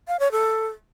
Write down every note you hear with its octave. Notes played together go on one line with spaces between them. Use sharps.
F5
C#5
A4